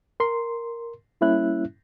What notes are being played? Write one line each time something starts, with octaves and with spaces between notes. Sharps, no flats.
A#4 C6
G3 A#3 C#4 E4 E5 F#6